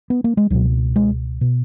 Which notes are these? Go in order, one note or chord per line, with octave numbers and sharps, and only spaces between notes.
B3
A#3
G#3
C#2 B2 F#3
G#3
B2